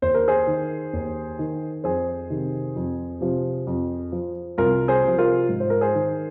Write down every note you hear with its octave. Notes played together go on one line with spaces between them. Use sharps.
D#2 C5
A#4
G#4 C5
D#3
D#2
D#3
F2 G#4 C5
C3 D#3
F2
C3 F3
F2
F3
C2 F4 A#4
G#4 C5
C3 F3
F4 A#4
G#2
C5
A#4
G#4 C5
D#3